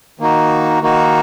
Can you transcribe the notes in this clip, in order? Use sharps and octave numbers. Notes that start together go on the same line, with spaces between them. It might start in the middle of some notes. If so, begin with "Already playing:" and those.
D#3 A#3 D#4 F#4
D#3 A#3 D#4 F#4